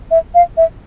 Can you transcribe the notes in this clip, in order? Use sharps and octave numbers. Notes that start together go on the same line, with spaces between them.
E5
F5
E5